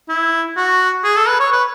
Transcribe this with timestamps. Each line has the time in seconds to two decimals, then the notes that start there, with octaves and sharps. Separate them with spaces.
0.09 E4
0.57 F#4
1.04 G#4
1.16 A4
1.28 B4
1.40 C#5
1.52 B4